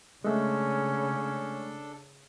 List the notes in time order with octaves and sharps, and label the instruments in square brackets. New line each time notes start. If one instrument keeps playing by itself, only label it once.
[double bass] C#3 [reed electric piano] G#3 A3 [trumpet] C#4 [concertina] D4 A4